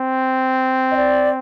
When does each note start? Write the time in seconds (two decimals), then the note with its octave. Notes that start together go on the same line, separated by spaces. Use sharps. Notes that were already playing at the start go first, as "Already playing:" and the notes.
Already playing: C4
0.91 D#5
0.96 D5